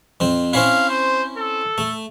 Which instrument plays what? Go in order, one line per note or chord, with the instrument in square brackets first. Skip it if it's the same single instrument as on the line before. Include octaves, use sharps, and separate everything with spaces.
[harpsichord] F2 C4
[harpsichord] C4 C#4 E4 [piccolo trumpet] F5
[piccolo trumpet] C5
A4
[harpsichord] A3